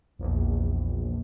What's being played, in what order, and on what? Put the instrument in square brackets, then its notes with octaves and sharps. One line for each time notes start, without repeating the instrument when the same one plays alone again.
[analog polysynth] A#1 E2